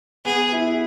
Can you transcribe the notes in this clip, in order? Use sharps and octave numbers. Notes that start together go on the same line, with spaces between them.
B3 G#4
E4